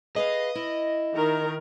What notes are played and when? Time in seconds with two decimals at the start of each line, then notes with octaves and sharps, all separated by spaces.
0.16 G#4 B4 D#5 F5
0.55 E4
1.15 D#3 A#4